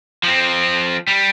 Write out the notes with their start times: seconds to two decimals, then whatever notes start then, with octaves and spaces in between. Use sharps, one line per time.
0.23 F3 C4
1.07 G3